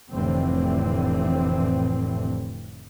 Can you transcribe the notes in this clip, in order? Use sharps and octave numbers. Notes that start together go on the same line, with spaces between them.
F1 A2 D3 E3 C4